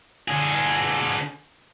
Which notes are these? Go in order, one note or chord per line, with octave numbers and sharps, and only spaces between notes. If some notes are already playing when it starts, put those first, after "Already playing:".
D3 G#4